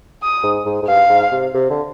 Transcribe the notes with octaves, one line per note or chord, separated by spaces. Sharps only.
D#6
G#2
G#2
G#2
G2 F5
G#2
C3
C3
D3